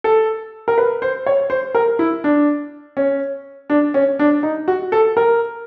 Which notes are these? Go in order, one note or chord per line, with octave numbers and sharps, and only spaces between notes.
A4
A#4
B4
C5
C#5
C5
A#4
E4
D4
C#4
D4
C#4
D4
D#4
F#4
A4
A#4